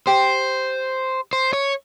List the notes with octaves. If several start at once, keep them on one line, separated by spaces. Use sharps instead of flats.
G4 C5
C5
C#5